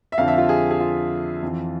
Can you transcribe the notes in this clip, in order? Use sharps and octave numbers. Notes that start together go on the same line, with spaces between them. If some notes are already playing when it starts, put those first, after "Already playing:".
E5
F2 D3 F3 F5
E5
F4
G#4
G#4
F4
F2 E3